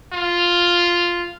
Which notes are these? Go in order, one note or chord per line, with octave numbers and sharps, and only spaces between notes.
F4